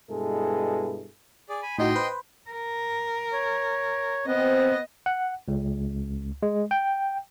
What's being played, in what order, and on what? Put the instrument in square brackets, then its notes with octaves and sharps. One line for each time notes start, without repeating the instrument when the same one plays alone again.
[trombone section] G2 B2 G#3 E4 G#4 A4
[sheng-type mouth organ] G#4 D5
G#5 B5
[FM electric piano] A2 D#4 F#4 [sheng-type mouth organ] D#5 G5 C6
[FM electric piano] B4 C5
[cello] A#4
[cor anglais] C#5
[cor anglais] B3 [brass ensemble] C4 [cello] D#5
[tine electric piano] F#5
C#2
G#3
G5